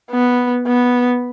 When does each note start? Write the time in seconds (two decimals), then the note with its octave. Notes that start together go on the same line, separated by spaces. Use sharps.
0.11 B3
0.67 B3